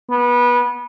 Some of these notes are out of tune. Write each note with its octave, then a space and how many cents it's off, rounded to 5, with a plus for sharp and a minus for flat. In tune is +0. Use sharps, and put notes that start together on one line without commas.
B3 -25